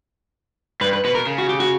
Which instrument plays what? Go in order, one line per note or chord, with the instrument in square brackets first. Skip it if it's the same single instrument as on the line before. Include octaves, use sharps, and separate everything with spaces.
[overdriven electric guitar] G2 [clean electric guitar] B4
[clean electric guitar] B4
[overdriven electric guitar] B2 [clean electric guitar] B4
[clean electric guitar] A#4
[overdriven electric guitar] C#3
[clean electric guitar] F#4
G4
F#4